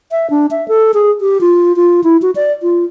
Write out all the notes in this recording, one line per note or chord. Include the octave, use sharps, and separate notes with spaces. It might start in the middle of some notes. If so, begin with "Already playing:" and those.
E5
D4
E5
A4
G#4
G4
F4
F4
E4
F#4
D5
F4